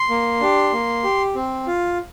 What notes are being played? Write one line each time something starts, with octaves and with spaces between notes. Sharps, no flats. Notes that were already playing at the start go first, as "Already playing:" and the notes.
Already playing: C6
A#3
D4 G4
A#3
G4
C4
F4